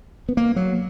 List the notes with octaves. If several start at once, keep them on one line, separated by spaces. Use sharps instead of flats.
B3
A#3
F#3